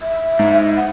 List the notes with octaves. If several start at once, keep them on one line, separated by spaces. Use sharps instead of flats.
E5
G#2
F#5